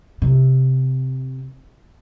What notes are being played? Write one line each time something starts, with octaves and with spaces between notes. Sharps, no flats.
C3